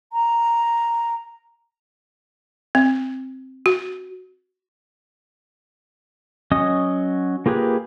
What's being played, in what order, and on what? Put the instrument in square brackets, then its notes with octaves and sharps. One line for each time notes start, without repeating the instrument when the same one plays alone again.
[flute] A#5
[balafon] C4
F#4
[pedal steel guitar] F#3 C#4 D#5 D#6
A#3 F4 G4 G#4 B4